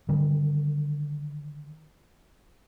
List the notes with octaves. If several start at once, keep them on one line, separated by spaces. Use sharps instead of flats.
D3 D#3 G3